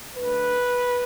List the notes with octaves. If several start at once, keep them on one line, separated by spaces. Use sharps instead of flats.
D3 A3 D4 B4